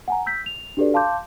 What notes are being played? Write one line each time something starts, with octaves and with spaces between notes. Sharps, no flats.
F#5 G#5 A#5
E6 G6 B6
F7
D4 F#4 G4 A4 B4 D5
F5 A5 C6 D6 G6